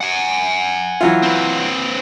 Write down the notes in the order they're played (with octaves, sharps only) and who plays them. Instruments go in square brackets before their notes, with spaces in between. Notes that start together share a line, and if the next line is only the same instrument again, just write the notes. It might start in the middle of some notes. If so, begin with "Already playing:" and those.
[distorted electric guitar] F#5 G#5
[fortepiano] E3 F#3 F4
[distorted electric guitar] C4 B4